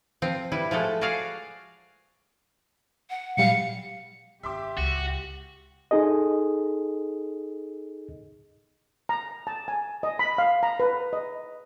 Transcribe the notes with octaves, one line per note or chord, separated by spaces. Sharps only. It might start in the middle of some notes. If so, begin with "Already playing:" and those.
F3 C4
G3 E4 B4
F3 G#3 A3 A4
F#4 G#4 D5 F5
F#5
A#2 F#3 G3 F5 C#7
G#1 G4 E5 C6 D6
C#2 F#4
D#4 G#4 A4 D#5
A#5
A5
G#5
D#5
B5
F5
A#5
B4
D#5